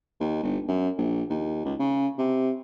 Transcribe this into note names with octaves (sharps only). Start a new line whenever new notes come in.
D#2
G1
F#2
A#1
D#2
C#2
C#3
C3